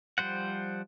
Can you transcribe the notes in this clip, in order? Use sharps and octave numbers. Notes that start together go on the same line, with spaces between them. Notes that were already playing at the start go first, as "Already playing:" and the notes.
F3 G3 C5 F#5